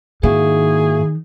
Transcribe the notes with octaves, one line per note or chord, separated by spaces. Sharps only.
G#2 D#3 A#3 E4 F#4 G#4